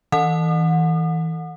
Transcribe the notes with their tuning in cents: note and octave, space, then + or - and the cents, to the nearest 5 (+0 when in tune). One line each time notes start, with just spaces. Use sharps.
E3 -30 F#5 -30 D#6 -40